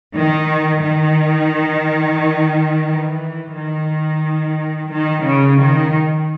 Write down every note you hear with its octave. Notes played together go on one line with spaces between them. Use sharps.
D#3
D#3
E3
D#3
D#3
C#3
D#3